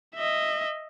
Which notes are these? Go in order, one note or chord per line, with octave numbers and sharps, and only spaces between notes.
D#5 E5